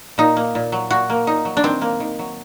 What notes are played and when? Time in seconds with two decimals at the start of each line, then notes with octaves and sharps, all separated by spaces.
0.18 A#2 D#4
0.37 A#3
0.55 A#2
0.72 F#3
0.90 A#2 F#4
1.10 A#3
1.27 A#2 D#4
1.45 F#3
1.57 D4
1.63 D#3 C4
1.82 A#3
2.00 D#3
2.19 F#3